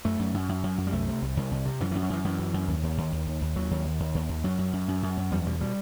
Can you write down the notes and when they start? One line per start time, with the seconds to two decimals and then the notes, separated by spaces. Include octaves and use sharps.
0.05 F#2 A3
0.19 F#2
0.34 F#2
0.49 F#2
0.63 F#2
0.78 F#2
0.87 G3
0.93 C2 A3
1.08 C3
1.22 C2
1.37 C2
1.51 C2
1.66 C3
1.80 F#2 E3
1.91 E3
1.95 F#2
2.03 F#3
2.10 F#2 E3
2.24 F#2 E3
2.39 F#2
2.54 F#2
2.68 D#2
2.83 D#2
2.98 D#2
3.12 D#2
3.27 D#2
3.41 D#2
3.56 D#2 F#3
3.71 D#2
3.85 D#2
4.00 D#2
4.15 D#2
4.29 D#2
4.44 F#2 F#3
4.58 F#2
4.73 F#2
4.88 F#2
5.03 F#2
5.17 F#2
5.31 E2 G3
5.46 B2 G3
5.61 B2 G3